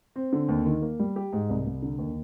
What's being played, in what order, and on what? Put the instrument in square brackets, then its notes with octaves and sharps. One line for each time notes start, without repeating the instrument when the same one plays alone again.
[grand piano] C4
D3
D#2
D#3
A#3
G3
G4
G#2
C2
C2
D3
D#2